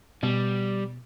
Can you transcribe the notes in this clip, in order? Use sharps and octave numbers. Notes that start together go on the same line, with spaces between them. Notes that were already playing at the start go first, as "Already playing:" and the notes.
B2 G3